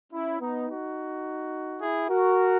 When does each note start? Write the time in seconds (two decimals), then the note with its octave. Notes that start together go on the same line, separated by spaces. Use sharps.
0.12 C#4 E4
0.40 B3 D#4
0.68 D#4 F#4
1.81 E4 G#4
2.09 F#4 A#4